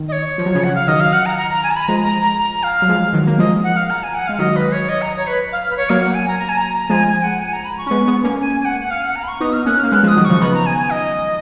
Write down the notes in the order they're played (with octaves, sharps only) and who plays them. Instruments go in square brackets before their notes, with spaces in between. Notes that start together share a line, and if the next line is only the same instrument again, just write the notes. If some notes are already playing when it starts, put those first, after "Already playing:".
Already playing: [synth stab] D#3
[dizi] D#5
C#5
[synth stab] F3
F#3
C#3 F3
[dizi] F#5
F5
[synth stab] D#3 F#3 [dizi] D#5
[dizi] F5
F#5
A#5
A#5
A#5
G#5
A#5
B5
[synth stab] F3 G#3 [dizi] A#5
[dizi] A#5
A#5
A#5
F5
[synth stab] F#3
F3 G#3
D#3 F#3
A#3
[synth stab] F3 G#3 [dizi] D#5
[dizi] F#5
F5
A#5
G#5
F#5
[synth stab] G#3 [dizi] F5
[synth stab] D#3 F#3 [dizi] D#5
[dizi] B4
C#5
D#5
A#5
C#5
B4
F5
B4
C#5
[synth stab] F#3 A#3 [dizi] F5
[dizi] F#5
G#5
A#5
A#5
G#5
A#5
A#5
[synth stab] F3 G#3 [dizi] G#5
[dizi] G#5
F#5
G#5
A#5
B5
C#6
[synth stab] C#4
G#3 B3
G#3 B3
A#3 C#4
[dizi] G#5
G#5
F#5
F#5
F5
F#5
A#5
B5
C#6
[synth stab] B3 D#4 [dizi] D#6
[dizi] F6
[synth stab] A#3 C#4 [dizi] F#6
[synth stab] A#3 [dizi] F6
[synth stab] G#3 B3 [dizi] F#6
[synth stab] F3 G#3
[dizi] D#6
[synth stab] D#3 F#3
[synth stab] C#3 F3 [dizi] C#6
[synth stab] B3 D#4 [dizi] B5
[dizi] A#5
G#5
G#5
D#5